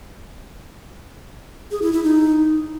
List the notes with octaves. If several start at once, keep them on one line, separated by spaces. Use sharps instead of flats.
G#4
E4
E4
D#4